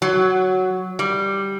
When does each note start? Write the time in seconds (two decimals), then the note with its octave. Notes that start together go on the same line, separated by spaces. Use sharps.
0.02 F#3
0.99 G3